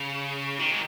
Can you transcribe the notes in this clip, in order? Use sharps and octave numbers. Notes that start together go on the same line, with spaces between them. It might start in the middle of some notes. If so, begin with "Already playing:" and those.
Already playing: C#3
D#3
G#3